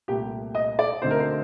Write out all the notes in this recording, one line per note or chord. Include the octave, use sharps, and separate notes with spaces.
C2 A#2 A3 G4
D#5
D5
D2 D3 A3 C4 D#4 C5
A#4
C5